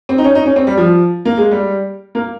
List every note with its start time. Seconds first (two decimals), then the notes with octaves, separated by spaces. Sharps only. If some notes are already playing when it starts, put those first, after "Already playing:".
0.09 C4
0.18 D#4
0.24 C#4
0.35 D#4
0.46 C#4
0.56 C4
0.67 G3
0.77 F3
1.25 A#3
1.38 G#3
1.51 G3
2.15 A#3